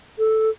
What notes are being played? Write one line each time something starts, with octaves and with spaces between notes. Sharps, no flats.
A4